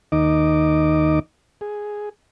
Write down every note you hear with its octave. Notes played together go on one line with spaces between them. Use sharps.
D#2 D#3 D#4 D#5 D6
G#4